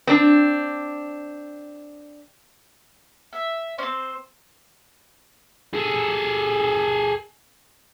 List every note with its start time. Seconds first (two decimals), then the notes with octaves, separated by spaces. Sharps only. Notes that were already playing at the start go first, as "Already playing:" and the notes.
0.07 C4 D4
3.33 E5
3.78 C4 C#4 C5
5.74 G#4 A4